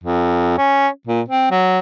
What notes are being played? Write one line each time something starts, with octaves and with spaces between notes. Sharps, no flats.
F2
C#4
A#2
C4
F#3